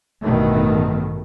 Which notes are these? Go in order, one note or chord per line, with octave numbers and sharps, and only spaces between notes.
A1 G2 B2 D#3 A3